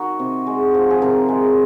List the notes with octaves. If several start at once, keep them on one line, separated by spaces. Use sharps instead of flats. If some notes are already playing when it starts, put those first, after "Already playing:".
Already playing: D#3 D#4 F#4
C3
G#3
F3
G#4
C3 A#4
G#3